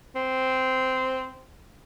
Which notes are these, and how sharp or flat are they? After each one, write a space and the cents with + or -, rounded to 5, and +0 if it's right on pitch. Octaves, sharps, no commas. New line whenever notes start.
C4 -10